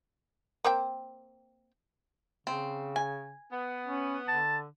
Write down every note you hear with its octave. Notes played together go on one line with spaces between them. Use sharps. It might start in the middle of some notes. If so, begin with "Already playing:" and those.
A#3 C4 G5
C#3 C4
G#5
B3
C#4
D3 A5